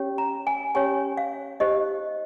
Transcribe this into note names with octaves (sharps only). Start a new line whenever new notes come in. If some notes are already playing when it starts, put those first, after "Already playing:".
Already playing: C#4 G4 C#5
A#5
G#5
C#4 G4 C#5 G#5
F5
D#4 G4 C5 D#5